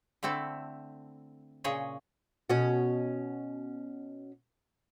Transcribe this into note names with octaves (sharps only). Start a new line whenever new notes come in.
D3 A3 C4 E4 A4
A#2 C#3 G#4 C#5 D#5
B2 C#4 F#4